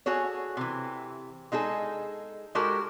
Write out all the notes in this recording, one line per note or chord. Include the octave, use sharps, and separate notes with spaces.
F#4 G#4 A4 C#5
C3 E3
G#3 D#4 G#4 A4
G#3 D#4 F#4 G4 A4 A#4